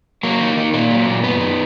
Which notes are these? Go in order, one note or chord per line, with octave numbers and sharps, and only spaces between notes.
F#3 A#3
D#3
D#3
A#2 A#3
F#3
A#2
F#2 B3
D#3